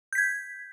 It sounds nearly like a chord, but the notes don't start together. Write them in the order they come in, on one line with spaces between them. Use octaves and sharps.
G6 B6 G#6